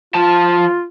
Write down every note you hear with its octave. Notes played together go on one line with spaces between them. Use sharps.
F3 F4 A5